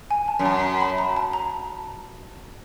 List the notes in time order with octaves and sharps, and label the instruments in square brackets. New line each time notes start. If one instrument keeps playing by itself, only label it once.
[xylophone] G#5
A5
[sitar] F#2
[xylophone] A5
B5
A#5
A5
A#5